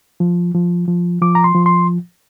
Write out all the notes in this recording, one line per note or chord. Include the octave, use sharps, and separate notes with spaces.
F3
F3
F3
F3 D6
A#5
C6
F3
C6